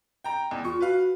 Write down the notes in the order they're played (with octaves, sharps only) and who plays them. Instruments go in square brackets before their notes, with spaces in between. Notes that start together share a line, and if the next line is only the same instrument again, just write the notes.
[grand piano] G5 A#5
E2
[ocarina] F4 [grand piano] C#6
[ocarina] F#4 [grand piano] B4 F5